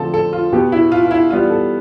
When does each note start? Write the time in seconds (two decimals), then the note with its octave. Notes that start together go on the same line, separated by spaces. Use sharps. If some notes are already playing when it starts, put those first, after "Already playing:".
Already playing: D3 F3 A3 C4 A4
0.14 A4
0.33 F4
0.52 B2 B3 G4
0.72 E4
0.92 F4
1.03 F4
1.11 E4
1.30 E3 G3 B3 F4
1.50 A4